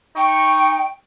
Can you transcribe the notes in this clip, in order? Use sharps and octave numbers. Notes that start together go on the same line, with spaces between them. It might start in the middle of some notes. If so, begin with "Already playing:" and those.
D#4 G5 C#6